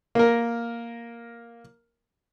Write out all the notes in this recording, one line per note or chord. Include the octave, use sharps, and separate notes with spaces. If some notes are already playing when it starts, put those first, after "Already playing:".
A#3 A#4